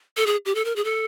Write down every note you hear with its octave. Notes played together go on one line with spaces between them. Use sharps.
A4
G#4
G4
A4
A#4
G#4
A4